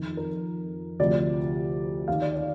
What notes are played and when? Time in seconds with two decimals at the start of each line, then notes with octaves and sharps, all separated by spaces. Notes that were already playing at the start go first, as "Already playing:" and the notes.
Already playing: F2 D#3
0.17 A#4
0.99 D2 C3 F3 D5
2.08 D#2 D#3 F5
2.22 D5
2.36 D5